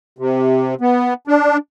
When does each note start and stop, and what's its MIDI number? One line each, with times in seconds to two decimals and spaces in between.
0.19 0.75 48
0.81 1.14 59
1.28 1.57 62